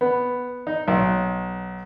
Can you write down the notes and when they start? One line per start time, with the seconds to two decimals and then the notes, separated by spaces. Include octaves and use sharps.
0.01 B3
0.67 D#4
0.88 B1